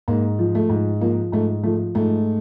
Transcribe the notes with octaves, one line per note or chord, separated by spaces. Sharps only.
G#2 A#3
F3
A3
G#2
F3 A#3
G#2 A3
F3 A3
G#2 A3